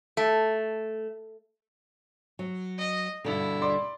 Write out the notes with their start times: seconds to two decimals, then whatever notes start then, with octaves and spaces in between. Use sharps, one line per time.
0.17 A3
2.39 F#3
2.78 D#5
3.25 G2 B2 D3 E4
3.62 D5 C6